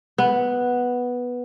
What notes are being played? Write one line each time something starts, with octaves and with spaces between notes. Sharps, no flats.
B3